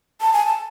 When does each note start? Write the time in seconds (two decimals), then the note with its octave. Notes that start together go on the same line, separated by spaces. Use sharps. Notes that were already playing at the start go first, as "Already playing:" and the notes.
0.21 A5
0.33 G#5
0.46 A5